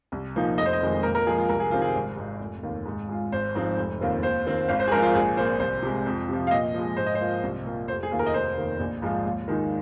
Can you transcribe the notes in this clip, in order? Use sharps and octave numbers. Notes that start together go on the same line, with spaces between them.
C2
A#2 F3 A#3 D#4
F1 D#5
C5
D#5
F2 D#3 G#3
A#2 A#4
A#4
F3 G#3 G#4
F4
C2 A#4
G#4
C3 D#3 C4 F4
G#4
G#1
G#2 G#3
F1
D#2 D#3
G#2
G#3 F4
G#1 C5
G#2 F3 C4 D#4
F1
D#2 D#3 C4 F4
D#2 C5
D#3 C4 F4
G#1 F5
C5
G#4
G#2 F3 G#3 C4 A#4
F4
A#1 G#4
A#2 A#3 F4 C5
C2 C5
C3 G#3
F2
C3 F3
F5
A#2 D#5
F3 G#3
G#2 C5
D#5
C5
F3 A#3 F4
C2
A#2 A#3 F4
F1 C5
G#4
D#2 D#3 A#3 F4
A#4
D#5
F1 C5
D#2 D#3
A#1
G#2 F3 G#3 F4
D#2
D#3 G#3 D#4